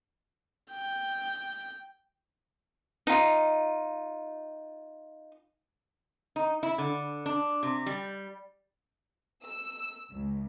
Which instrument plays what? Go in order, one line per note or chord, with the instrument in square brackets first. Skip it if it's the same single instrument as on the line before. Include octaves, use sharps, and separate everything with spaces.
[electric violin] G5
[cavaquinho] D#4 F4
[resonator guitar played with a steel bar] D#4
E4
D3
D4
C3
G3
[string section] E6
C#2